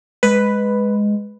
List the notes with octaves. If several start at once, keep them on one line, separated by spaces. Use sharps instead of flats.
G#3 B4